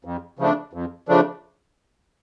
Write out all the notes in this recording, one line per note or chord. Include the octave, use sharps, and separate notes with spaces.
F2
C#3 F3 A3 D4
F2
C#3 F3 A3 D4